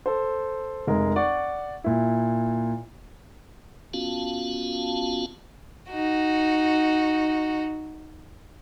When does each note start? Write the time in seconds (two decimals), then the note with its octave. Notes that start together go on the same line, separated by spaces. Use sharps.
0.06 A4 C5
0.87 F1 G#3 A#4
1.16 D5 F#5 C#6
1.84 A#2 E4
3.94 B3 C#4 F4 F#4 F5 A5
5.90 D#4 F#4